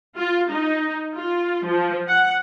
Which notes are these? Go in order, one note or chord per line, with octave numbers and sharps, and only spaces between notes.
F4
D#4
F4
F3
F#5